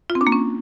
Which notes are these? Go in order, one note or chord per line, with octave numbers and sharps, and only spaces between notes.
F4
C4
D4
A#3
C#4